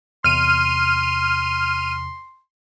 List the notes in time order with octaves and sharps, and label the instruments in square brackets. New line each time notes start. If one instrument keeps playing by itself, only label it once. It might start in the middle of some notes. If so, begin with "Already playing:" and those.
[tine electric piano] E2 C3 [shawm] C6 [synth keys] F6 D#7